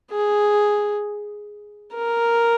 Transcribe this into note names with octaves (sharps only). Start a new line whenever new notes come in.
G#4
A#4